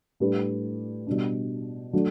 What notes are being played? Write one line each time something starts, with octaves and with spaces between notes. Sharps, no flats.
A2 G3 D4 G4 B4
B2 G3 D4
F#3 A3 D4 F#4